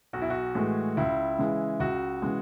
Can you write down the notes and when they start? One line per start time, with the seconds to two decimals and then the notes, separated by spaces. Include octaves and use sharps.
0.13 B1 F#4
0.22 E4
0.30 F#4
0.55 A2 E3 G#3
0.97 C#2 E4
1.39 C#3 E3 G#3
1.80 C#2 F#4
2.22 C#3 E3 G#3